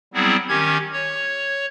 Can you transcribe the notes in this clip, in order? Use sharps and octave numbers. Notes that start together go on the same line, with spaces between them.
F#3 G3 B3 C4 E4 G#4
D#3 C#4 G4 G#6
C#5